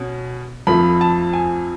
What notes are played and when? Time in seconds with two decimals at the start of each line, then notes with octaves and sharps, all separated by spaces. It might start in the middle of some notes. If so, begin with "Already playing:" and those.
Already playing: B2 C#4
0.67 F2 F3 A3 B5
1.01 A5
1.33 G#5